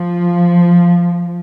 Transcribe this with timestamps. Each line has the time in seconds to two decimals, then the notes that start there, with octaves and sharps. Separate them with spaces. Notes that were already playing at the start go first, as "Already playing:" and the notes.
Already playing: F3